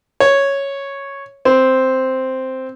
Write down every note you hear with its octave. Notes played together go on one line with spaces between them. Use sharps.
C#5
C4